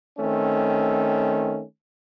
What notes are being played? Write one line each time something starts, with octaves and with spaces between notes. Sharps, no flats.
D#3 A3 C4 C#4